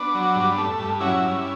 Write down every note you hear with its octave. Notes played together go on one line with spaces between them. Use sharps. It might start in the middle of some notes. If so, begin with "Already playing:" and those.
Already playing: B3 D4
F#3
G2
A3
G2
F#3 C#4 E4
G2